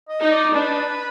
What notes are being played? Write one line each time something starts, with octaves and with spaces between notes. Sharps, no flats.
D#5
D#4
D5
D4 B4